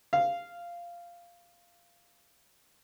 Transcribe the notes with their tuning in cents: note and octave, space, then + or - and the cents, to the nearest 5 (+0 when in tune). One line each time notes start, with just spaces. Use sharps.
F5 -10